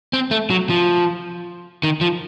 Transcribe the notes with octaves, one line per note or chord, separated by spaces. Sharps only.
C4
A3
F#3
F3
D#3
F3